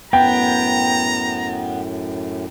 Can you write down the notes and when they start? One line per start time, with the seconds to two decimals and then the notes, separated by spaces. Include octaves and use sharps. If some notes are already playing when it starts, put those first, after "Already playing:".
0.13 F#2 A2 B3 G5 A#5